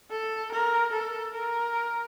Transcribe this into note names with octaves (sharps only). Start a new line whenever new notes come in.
A4
A#4
A4
A#4